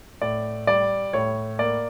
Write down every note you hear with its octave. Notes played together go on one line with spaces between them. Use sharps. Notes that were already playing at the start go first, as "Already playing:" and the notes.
A2 D5
G3 D5
A2 C#5
A#3 D5